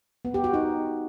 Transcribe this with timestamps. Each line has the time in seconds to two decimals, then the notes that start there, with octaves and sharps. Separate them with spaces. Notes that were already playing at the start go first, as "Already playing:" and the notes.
0.25 B3
0.34 G4
0.44 F#4
0.54 D#4